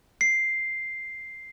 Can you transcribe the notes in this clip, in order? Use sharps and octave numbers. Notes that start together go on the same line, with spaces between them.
C7